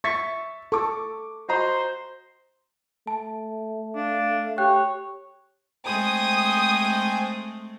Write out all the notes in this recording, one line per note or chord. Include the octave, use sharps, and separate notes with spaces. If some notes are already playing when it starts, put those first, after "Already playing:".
E5 C#6 A6 B6
A4 C#6 D6
F#4 C5 D#5 A#5
A3 A5
D4 F5
G4 C#5 G5 F#6
G#3 A3 C4 C5 G5 G#5 D#6